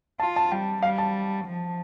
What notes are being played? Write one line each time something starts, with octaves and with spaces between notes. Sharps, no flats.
F4 A5
A5
G3 G5
G3 F5
A5
F3